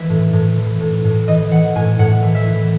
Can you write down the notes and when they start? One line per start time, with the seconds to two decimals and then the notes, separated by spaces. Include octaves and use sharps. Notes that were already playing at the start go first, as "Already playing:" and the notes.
Already playing: E3 E5
0.09 A2
0.33 A2
0.57 E3
0.81 A2
1.04 A2
1.28 E3 D#5
1.51 E3 F#5
1.75 A2 G#5
1.99 A2 F#5
2.23 E3
2.35 E5
2.46 E3